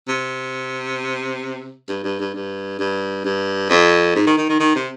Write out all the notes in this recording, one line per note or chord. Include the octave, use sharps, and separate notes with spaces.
C3
G2
G2
G2
G2
G2
G2
F2
G#2
D#3
D#3
D#3
D#3
C3